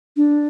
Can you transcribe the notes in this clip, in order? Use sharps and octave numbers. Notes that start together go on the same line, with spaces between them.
D4